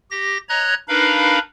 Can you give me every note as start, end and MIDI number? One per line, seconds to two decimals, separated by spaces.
0.11 0.38 67
0.11 0.38 94
0.49 0.74 73
0.49 0.74 75
0.49 0.74 82
0.49 0.74 90
0.49 0.74 92
0.88 1.39 62
0.88 1.39 63
0.88 1.39 70
0.88 1.39 71
0.88 1.39 77
0.88 1.39 83